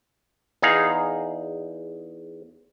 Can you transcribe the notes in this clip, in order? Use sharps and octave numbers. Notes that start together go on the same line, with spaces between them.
E2 D#4 G#4 F5